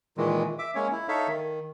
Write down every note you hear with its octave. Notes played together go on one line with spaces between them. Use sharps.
A#2 D#3 E3 G#3
E5 D6
G#3 A#3 C#4 C#5
E4
D#4 A4 C#5 E5 F5
D#3